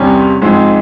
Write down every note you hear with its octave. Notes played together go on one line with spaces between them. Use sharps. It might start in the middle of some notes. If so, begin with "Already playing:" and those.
Already playing: E2 C3 G3 C#4
G#2 F3 G#3 C4